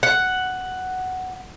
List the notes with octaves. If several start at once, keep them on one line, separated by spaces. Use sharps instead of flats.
F#5